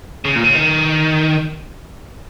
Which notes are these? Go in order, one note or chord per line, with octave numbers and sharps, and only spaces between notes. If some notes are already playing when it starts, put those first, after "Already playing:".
C#3
A#2
C#3
D#3